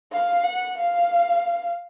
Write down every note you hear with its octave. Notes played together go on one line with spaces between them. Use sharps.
F5
F#5
F5